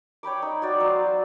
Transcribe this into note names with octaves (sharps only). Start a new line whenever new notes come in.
C#5 G5 B5 D6
D#4
F#4 C#5 D5 G5
F#3 C5 F5